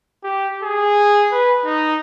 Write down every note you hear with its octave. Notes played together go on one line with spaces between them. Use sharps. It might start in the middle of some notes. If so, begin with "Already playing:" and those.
G4
G#4
B4
D#4